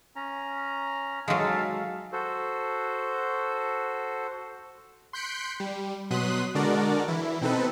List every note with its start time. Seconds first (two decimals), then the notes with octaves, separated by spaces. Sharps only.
0.16 C#4 A#5
1.28 F#3 G#3 D#4 A4 E5 F5 A5
2.12 F#4 A4 C5
5.13 C6 F#6 G6 B6 C#7 D7
5.60 G3
6.11 B2 F#3 C6 D#6 F#6 B6
6.55 D3 G#3 D4 F#4 A#4 D5
7.08 E3 E4
7.41 B2 C4 D#4 A4 B4